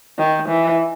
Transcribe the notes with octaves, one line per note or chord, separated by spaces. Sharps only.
D#3
E3